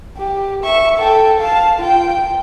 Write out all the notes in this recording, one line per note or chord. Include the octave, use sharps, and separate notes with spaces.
G4
E5 C#6
A4 G5
F5 A5
F4 G5